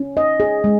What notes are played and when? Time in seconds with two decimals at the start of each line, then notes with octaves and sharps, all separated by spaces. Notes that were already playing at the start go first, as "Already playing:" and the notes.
Already playing: C#4
0.17 D#5
0.40 G#4
0.64 G#3